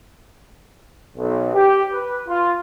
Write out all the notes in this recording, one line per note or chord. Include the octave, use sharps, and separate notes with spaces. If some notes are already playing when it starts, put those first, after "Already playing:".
B1
G4
B4
F4